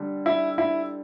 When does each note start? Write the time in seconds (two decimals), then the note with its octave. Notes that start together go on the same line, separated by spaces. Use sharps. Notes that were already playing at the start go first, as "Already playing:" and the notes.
Already playing: D3 G3
0.26 E4
0.58 E4